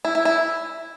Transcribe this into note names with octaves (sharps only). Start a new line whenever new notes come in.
E4
E4
E4